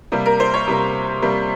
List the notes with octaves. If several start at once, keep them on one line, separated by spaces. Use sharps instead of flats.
C3 G3 A#3
A#4
C5
C#5
C3 G3 A#3
C3 G3 A#3